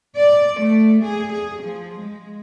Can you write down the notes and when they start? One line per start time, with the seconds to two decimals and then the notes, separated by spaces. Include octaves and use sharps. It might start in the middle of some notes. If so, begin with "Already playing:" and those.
0.16 D5
0.61 A3
1.02 G#4
1.32 G#4
1.63 F3
1.99 G#3